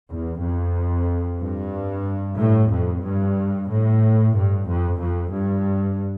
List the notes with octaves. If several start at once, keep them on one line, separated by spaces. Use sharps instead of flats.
E2
F2
G2
A2
F2
G2
A2
G2
F2
F2
G2